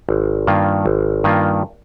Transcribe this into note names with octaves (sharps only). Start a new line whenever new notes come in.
G#1
G2 D#3 A#3 F4
G#1
G2 D#3 A#3 F4